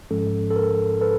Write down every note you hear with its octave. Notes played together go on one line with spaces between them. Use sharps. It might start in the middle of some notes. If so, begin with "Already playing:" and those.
G#2 F3 G#3 C#4 A4
A4
A#4
A4 B4